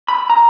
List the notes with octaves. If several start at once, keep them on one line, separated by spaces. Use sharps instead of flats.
B5
A#5